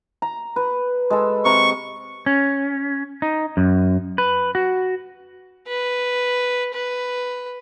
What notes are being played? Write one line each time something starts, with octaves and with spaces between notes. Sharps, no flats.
A#5
B4
G#3 A4
C3 A#5 C#6
C#4
D#4
F#2
B4
F#4
B4
B4